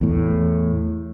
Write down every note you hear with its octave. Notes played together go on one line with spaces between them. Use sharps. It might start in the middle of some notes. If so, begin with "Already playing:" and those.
E2 A2